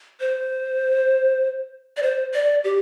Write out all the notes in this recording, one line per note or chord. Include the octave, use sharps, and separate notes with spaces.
C5
D5
C5
D5
G4